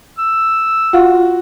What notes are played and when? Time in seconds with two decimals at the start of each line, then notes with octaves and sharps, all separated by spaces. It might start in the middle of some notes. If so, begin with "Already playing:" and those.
0.18 E6
0.93 F4 F#4